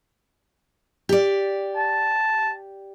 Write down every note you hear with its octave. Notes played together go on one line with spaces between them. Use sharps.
G4 D5
A5